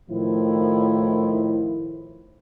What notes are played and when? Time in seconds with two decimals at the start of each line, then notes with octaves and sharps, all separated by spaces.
0.10 A2 D#3 F3 E4